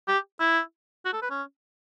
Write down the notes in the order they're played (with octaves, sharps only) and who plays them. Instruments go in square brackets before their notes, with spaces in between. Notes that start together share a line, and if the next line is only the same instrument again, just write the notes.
[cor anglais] G4
E4
F#4
A4
B4
C#4